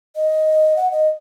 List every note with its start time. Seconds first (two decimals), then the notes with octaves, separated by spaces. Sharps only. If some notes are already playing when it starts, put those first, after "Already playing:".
0.16 D#5
0.76 F#5
0.91 D#5